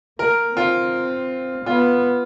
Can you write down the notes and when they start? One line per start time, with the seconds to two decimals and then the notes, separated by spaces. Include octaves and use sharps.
0.19 A#3 A#4
0.56 C4 F4
1.66 B3 F4